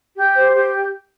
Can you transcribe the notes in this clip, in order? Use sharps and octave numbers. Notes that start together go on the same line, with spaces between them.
G4
C5
G4